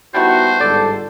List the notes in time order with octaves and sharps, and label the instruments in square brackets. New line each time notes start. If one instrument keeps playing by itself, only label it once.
[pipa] G3 A3 E4 [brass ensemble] B3 D#4 F#4 [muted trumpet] C5
[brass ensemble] G1 G#2 A4 [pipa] D5